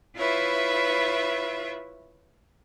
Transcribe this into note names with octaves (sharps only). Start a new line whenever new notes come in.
E4 F4 B4 C#5 E5